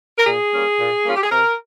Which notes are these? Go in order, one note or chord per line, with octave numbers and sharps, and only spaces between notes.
A#4
A#2 G#4
G3 A#3 C#4
A#2
G3 A#3 C#4 F4
G4
G#4
C3 A#4